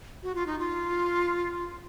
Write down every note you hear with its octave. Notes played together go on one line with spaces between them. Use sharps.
F#4
F4
D#4
F4